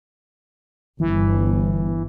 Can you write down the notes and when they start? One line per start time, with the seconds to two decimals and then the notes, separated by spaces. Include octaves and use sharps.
1.00 G1 E3